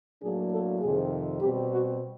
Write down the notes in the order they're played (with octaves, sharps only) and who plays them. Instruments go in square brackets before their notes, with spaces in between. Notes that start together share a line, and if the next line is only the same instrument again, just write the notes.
[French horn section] A2 F#3 A#3 D4 G#4
A4
F2 C3 D#3 G#4
B2 G3 C4 G4
F#4